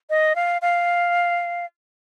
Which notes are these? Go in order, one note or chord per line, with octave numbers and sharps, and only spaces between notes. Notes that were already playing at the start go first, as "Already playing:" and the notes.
D#5
F5
F5